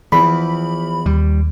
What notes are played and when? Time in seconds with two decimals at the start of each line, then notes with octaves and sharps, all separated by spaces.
0.12 E2 E3 F3 B5
1.06 D#2 G3